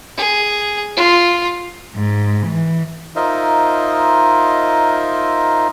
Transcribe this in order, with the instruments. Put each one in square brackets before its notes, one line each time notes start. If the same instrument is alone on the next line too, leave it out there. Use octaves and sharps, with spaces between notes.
[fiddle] G#4
F4
[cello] G#2
E3
[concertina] D#4 F4 A#4 C5 D#5 E5